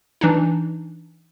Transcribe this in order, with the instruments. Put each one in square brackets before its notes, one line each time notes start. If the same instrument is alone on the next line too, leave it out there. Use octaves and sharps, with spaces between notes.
[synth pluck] E3 D4 D#4